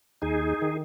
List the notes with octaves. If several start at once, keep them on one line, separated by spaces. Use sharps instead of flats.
D#2 D#4 G#4
D#3